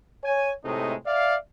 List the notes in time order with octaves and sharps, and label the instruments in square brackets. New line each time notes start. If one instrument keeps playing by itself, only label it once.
[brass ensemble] C#5 G#5
A2 C3 G#3 A3 D#4
D5 E5 F5